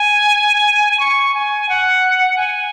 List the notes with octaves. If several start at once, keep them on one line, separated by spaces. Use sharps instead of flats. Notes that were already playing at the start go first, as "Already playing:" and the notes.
Already playing: G#5
C#6
G#5
F#5
G#5